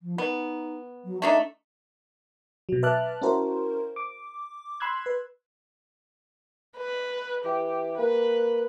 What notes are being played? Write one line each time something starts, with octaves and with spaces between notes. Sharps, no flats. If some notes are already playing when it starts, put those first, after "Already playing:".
F3
B3 D#4
F#3
A3 D4 D#4 E5
B2 F#3
B4 E5 A5 D6 F6 F#6
C#4 E4 F#4 A#4 C5
D6
B5 C6 E6 F#6 G#6
B4
B4
E3 G4
A#3 B4